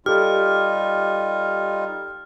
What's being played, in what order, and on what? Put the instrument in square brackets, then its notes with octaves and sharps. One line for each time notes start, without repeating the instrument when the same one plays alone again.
[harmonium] G3 D#4 F4 [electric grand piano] G4 A4 [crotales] F6